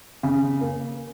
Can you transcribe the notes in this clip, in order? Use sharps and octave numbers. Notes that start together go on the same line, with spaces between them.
C#3
A#3